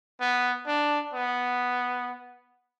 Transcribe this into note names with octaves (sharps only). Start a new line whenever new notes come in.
B3
D4
B3